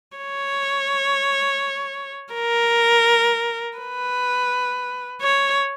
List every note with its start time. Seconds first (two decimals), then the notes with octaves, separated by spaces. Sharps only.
0.17 C#5
2.33 A#4
3.78 B4
5.22 C#5